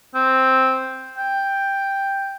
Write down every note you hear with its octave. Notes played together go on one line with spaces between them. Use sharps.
C4
G5